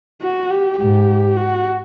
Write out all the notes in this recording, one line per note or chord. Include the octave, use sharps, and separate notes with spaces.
F#4
G4
G#2 G4
F#4